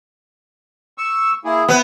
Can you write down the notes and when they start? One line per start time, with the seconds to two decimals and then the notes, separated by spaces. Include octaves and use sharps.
0.98 C#6 E6
1.45 A#3 E4 G#4
1.69 B3 E4